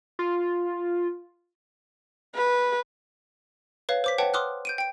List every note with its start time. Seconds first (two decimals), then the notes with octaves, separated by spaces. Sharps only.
0.19 F4
2.35 B4
3.89 B4 C#5 F5
4.04 C5 D6 B6
4.18 B4 C#5 F#5 G5 A5
4.34 C6 D6 D#6 F6 F#6
4.65 G6 D7 D#7
4.78 G5 D7